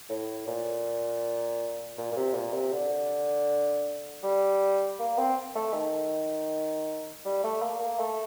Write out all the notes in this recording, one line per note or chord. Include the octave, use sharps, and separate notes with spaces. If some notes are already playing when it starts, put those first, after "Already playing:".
A2
A#2
A#2
A#2
C3
A#2
C3
D3
G3
A#3
C4
A3
D#3
G3
A3
A#3
A#3
A3